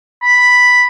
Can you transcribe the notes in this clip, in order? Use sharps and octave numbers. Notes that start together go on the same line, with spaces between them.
B5